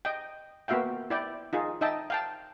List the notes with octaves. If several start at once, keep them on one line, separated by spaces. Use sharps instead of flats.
D#5 G5
A#3 B3 F#4 E5 F5 G5
E4 D5 G5
D#4 F4 G#4
D#4 D#5 E5 G5 A5
F5 G5 A5